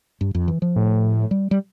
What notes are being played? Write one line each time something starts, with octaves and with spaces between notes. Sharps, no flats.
G2
F2
E3
F3
A2
G3
G3